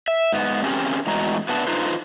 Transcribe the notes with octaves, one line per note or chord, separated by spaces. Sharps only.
E5
G#2 B3
C4 C#4 G4 G#4 A#4
E2 A2 G#3 F#4 A#5
B3 D4 B4 D5 E5 A5
D3 D#4 F4 B4 C5